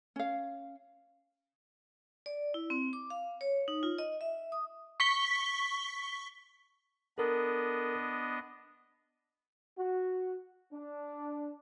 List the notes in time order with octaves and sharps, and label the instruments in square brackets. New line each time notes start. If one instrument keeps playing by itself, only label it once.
[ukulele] C#4 F5
[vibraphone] D5
E4
C4
D6
F5
C#5
D#4
F4
D#5
E5
D#6
[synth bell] C#6 B6 G7
[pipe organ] B3 D4 D#5 [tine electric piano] A4 A#4
[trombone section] F#4
D4